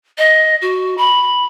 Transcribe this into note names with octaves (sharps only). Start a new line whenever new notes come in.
D#5
F#4
B5